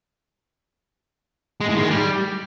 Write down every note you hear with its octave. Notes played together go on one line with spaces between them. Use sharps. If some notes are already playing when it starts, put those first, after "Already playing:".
G#3
A2
D#3
G#3
G3